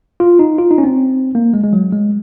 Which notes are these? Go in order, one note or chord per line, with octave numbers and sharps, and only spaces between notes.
F4
D#4
F4
D#4
C#4
C4
A#3
G#3
G#3
F#3
G#3